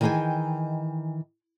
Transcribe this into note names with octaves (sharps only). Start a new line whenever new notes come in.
D#3 E3 D#4 G#4 G5 G#5